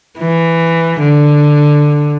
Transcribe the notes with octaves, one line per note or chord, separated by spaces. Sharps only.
E3
D3